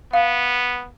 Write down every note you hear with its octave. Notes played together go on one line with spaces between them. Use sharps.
B3 F5